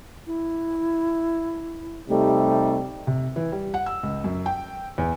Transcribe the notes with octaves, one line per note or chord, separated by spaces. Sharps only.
E4
C3 G3 A3 D#4
C3
E3
G3
F#5
E6
C#2
F#2
G5
E2